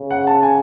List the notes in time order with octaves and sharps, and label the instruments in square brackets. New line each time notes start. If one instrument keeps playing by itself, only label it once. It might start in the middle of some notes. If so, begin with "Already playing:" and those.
Already playing: [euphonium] C#3
[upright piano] F#5
A5
G#5